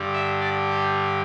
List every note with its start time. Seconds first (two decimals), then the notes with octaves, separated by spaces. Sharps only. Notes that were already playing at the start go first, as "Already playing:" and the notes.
Already playing: G2 D3 G3
0.13 E5
0.41 D5
0.70 G4